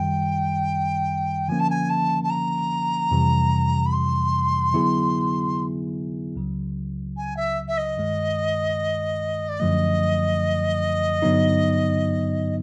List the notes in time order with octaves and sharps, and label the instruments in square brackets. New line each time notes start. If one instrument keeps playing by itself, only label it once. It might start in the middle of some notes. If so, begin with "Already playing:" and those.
Already playing: [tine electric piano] F#2 D#3 G3 [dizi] G5
[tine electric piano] D3 F3 A#3 C#4 [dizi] G#5
[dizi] A5
G#5
A5
A5
A#5
[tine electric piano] F2 C3 E3 G3
[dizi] B5
C6
[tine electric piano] D3 F#3 B3 E4 G#4
C#2 C#3 F#3
[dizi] G#5
E5
E5
D#5
[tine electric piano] G2 D#3 G#3
[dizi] D5
[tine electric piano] F#2 D3 F3 A3 [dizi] D#5
[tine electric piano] G2 D3 F#3 B3 D#4